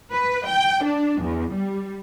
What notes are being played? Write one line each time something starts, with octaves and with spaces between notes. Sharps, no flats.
B4
G5
D4
E2
G3